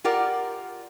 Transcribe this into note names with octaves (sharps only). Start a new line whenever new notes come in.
F4 G4 A#4 D5 F#5